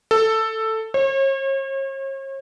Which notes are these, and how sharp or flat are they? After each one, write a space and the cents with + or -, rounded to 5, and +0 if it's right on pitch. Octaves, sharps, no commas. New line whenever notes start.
A4 +10
C#5 -40